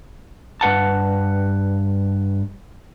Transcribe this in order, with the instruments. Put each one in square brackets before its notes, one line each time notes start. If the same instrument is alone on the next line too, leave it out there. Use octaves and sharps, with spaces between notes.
[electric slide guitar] G2 B4 F#5 A5